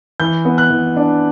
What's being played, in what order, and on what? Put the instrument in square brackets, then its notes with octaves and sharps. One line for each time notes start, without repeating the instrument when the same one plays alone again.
[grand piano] E3 G6
B3
F#6
E3
D4